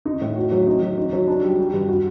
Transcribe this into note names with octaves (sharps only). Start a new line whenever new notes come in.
D#4
A2
F#4
F#3
D#4
F#3
D#4
F#3
D4
G3
G3
G2
F#4